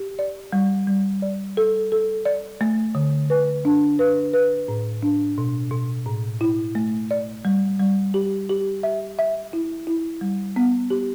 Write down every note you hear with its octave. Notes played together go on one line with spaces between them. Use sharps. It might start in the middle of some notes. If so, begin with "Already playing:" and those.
Already playing: G4
D5
G3
G3
D5
A4
A4
D5
A3
D3
B4
D4
B4
B4
A2
D4
B2
B2
A2
E4
A3
D5
G3
G3
G4
G4
E5
E5
E4
E4
G3
B3
G4